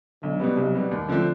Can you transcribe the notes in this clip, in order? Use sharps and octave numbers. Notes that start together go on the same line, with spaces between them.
B1 D3
B2 G3 B3
B1 C3
B2 G3 B3
D#2
D3 F3 A3 C4